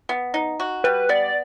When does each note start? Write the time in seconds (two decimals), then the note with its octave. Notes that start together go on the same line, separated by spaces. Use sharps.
0.09 B3
0.34 D#4
0.60 F#4
0.84 G3 B4
1.09 B3 D5